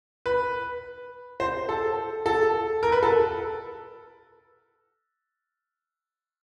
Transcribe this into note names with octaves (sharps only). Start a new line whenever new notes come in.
B4
C5
A4
A4
A#4
B4
A4